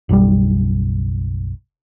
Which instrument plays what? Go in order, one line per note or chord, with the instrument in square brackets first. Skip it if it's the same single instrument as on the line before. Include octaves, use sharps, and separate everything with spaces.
[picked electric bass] F#1 B1 G3